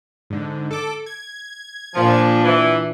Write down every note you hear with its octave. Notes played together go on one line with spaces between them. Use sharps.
G#2 D3
A4 D6
G#6
A#2 F3 A#3 D4
E3